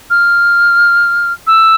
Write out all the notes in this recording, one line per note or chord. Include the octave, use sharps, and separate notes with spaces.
F6
E6